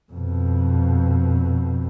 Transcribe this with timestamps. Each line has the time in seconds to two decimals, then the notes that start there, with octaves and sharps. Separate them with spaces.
0.13 F2 B2